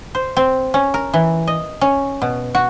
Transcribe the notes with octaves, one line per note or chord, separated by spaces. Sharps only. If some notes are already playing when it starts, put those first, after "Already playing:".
C5
C4
C#4
A#4
E3
D#5
C#4
B2
F#4